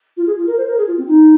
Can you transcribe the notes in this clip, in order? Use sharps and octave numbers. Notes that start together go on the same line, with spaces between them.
F4
G#4
F4
A#4
C5
A#4
G#4
F4
C4
D#4